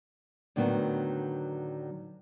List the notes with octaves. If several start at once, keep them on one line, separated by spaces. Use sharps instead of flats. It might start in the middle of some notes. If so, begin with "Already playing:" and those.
A2 D3 D#3 F#3 B3